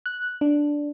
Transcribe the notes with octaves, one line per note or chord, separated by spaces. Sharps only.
F#6
D4